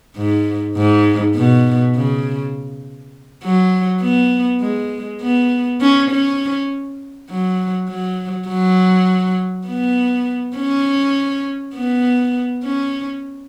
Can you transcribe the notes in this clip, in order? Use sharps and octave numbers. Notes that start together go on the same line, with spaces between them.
G#2
G#2
B2
C#3
F#3
B3
G#3
B3
C#4
C#4
F#3
F#3
F#3
B3
C#4
B3
C#4